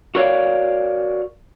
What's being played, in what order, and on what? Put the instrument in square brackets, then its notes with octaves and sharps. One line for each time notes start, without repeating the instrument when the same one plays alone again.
[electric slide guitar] F#4 A#4 C#5 D5 F5